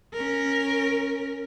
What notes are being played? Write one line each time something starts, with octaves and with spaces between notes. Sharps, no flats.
C#4 A#4